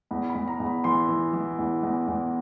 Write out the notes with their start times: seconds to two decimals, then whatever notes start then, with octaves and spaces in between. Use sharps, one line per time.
0.11 E2 B5
0.29 B5
0.35 E2
0.48 A#5
0.60 E2
0.66 B5
0.84 E3 C6
1.09 E3
1.33 E3
1.59 E2
1.83 E2
2.08 E2